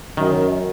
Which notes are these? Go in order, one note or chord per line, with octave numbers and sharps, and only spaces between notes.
F#2 D#3